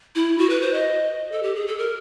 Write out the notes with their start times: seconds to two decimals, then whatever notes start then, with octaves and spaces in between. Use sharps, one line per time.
0.15 E4
0.38 F#4
0.50 B4
0.61 C5
0.74 D#5
1.32 A4
1.43 G4
1.55 G#4
1.67 A4
1.78 A#4